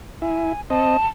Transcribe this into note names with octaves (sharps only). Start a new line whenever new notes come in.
E4 G#5
C4 D#5 A5